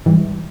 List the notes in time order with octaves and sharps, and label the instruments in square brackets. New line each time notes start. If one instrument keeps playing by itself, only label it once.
[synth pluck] G#1 G#2 E3 G3